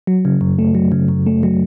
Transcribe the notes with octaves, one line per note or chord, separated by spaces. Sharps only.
F#3
C#3
F#2
A3
F#3
C#3
F#2
A3
F#3